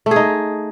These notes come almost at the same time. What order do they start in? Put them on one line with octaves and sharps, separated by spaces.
A3 G#4 D#4